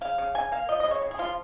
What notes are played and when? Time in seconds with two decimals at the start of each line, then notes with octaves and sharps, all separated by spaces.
0.01 C#3 F5
0.18 C#3
0.35 C#3 G#5
0.52 A#3 F5
0.68 F3 D#5
0.80 C#3 D#5
0.91 C#5
1.02 C#3
1.11 G#4
1.18 F3 F4